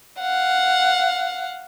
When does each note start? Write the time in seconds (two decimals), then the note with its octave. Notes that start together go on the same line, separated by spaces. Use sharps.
0.21 F5 F#5